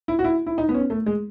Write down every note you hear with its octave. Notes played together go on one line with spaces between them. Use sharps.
E4
F#4
E4
E4
D#4
B3
C#4
A3
G#3